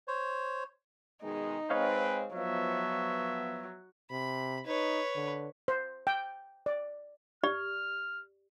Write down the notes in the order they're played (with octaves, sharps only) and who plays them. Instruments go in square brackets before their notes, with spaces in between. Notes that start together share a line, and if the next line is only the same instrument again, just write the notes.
[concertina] C5 C#5
[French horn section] B2 D#3 G#3 [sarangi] D#4
[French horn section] G#3 C4 [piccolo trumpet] B4 [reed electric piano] C#5 D#5 F5
[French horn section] F3 B3 [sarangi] F#3 [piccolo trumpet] E5
[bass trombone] C3 [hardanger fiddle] B5
[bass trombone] D#4 [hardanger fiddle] B4 C#5
[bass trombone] D3
[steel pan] C5
G5
D5
[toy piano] G4 D5 [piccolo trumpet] F6